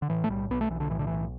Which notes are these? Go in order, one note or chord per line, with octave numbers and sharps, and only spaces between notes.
D3
A2 E3
A3
B1 G3
B1 B3
A3
B1 E3
D3
A2 E3
D3
B1 E3